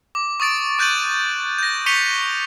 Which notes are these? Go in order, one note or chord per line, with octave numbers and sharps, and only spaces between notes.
D6
C#6 D#6 A6 D7
C#6 F#6 G6 A6 D#7 F#7
G6 A#6
C#6 B6 C#7 D#7 F7 G7